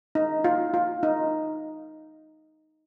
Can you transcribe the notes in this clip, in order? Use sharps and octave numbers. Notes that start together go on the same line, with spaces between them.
D#4
F4
F4
D#4